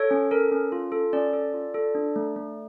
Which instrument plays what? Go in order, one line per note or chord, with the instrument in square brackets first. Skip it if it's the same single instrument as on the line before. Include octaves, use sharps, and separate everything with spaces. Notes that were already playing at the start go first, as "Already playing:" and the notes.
Already playing: [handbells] A4 C#5
C#4
A4 A#4
C#4
F4
A4
C#4 D5
A4
F4
A4
D4
A3
A3